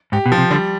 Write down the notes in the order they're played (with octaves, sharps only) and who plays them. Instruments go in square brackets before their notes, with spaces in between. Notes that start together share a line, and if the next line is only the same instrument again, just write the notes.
[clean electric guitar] G#2 [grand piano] G4
[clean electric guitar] B2
[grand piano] F3
[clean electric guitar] C3
[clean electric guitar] D3 [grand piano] G3